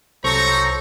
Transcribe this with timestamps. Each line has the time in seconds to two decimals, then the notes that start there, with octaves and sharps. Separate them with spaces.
0.24 C2 F#3 D#4 A4 C5 A#5 C#6